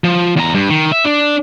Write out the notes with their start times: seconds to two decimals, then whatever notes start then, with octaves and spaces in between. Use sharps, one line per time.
0.04 F3
0.37 E2 A#5
0.55 G2
0.70 D#3
0.92 E5
1.04 D4